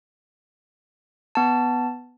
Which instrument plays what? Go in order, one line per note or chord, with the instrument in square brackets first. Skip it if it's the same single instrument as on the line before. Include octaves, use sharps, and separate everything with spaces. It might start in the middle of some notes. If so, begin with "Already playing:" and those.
[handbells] B3 A5